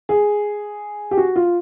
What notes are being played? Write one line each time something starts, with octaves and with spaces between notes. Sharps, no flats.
G#4
G4
F#4
F4